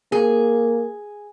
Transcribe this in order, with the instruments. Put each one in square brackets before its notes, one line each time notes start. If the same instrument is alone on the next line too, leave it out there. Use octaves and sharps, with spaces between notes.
[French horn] A#3 [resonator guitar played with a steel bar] G#4